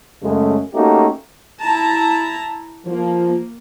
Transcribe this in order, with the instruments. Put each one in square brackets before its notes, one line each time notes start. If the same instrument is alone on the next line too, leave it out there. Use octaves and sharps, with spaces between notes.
[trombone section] F#2 C#3 G#3 A3
A3 A#3 C#4 D#4 F#4 G4
[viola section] E4 A5 A#5
[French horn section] F3 [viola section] A#3